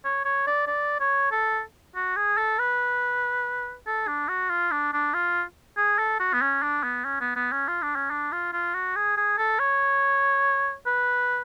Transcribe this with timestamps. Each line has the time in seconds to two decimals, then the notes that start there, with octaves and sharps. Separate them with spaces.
0.05 C#5
0.25 C#5
0.47 D5
0.67 D5
1.00 C#5
1.32 A4
1.95 F#4
2.16 G#4
2.37 A4
2.59 B4
3.87 A4
4.07 D4
4.28 F#4
4.50 F4
4.71 D4
4.93 D4
5.14 F4
5.77 G#4
5.98 A4
6.19 F#4
6.33 B3
6.41 C#4
6.62 D4
6.83 B3
7.05 C#4
7.21 B3
7.36 B3
7.52 C#4
7.68 F4
7.82 D4
7.96 C#4
8.10 D4
8.32 F4
8.53 F4
8.75 F#4
8.96 G#4
9.17 G#4
9.38 A4
9.59 C#5
10.87 B4